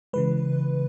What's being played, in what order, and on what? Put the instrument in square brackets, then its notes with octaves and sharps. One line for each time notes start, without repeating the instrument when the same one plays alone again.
[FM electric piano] C#3 E3 G#3 B4